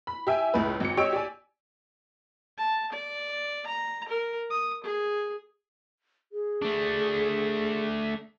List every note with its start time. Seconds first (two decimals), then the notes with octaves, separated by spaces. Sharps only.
0.07 B5
0.27 G4 E5 G5 G#5
0.54 C#2 A2 B4
0.80 G#1 C#7
0.97 G4 C#5 D#5 E6 D7
1.13 G4 D5 G#5
2.58 A5
2.92 D5
3.67 A#5
4.09 A#4
4.50 D#6
4.84 G#4
6.32 G#4
6.62 A3 D4